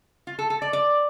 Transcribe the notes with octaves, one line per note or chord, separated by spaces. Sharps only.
F4
A4
A4
D5
D5